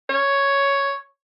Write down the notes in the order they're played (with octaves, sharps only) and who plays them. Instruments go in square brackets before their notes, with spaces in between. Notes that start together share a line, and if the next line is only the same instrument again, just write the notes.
[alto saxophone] C#5